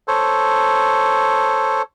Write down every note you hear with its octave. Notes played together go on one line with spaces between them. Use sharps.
A4 C5 C#5